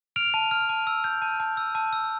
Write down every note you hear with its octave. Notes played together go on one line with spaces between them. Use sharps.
F6 D7 F7
A5
F6
A5
E6
G6
A5
A5
E6
A5
E6